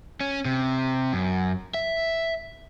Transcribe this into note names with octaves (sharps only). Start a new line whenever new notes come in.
C#4
C3
F#2
E5